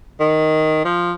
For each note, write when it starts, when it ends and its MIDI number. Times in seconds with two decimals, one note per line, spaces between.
0.20 0.82 51
0.84 1.13 53